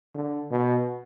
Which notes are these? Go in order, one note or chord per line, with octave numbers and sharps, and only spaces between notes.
D3
B2